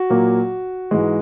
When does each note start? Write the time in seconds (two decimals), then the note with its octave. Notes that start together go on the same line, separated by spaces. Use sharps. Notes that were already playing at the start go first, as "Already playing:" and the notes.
Already playing: F#4
0.10 A#2 F#3 A#3
0.91 G#2 E3 G#3